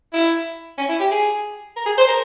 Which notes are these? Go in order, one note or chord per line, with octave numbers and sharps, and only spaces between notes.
E4
C#4
E4
G4
G#4
A#4
G#4
C5
A#4